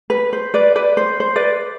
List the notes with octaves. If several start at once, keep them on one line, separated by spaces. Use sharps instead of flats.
B4
C5
B4 D5
B4 D5
C5
C5
B4 D5